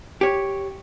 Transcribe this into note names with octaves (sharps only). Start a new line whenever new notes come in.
G4 C#5